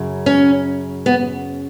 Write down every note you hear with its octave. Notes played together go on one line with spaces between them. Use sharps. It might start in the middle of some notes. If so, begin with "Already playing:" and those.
Already playing: F#2 C#3 F#3
C#4
B3